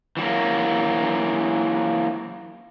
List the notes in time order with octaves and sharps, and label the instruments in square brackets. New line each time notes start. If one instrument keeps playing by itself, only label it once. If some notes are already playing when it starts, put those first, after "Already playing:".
[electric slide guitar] E3 F#3 A#3